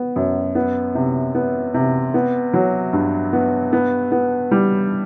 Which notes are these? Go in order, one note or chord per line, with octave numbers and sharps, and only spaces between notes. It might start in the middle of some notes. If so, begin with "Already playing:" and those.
Already playing: B3
F#2
B3
C3
B3
C3
B3
F#3
G2
B3
B3
B3
G3